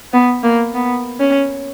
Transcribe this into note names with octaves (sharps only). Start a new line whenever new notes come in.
B3
A#3
B3
C#4